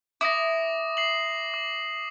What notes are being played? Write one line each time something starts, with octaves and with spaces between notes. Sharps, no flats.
E4 D6 D#6 A#6
C7 F#7
D6